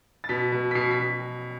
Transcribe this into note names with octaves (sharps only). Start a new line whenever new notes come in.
A6
B2 B6
B2
B6
B2 C7
B6
B2